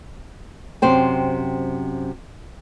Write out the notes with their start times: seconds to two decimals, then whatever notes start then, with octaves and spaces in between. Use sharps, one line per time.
0.82 F#2 C3 C5 G5